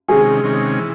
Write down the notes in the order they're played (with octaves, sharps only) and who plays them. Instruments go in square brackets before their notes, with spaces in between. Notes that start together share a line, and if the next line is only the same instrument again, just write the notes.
[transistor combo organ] C3 D#3 G#3 C#4 [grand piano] G#4
[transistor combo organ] C3 D#3 G#3 C#4
E3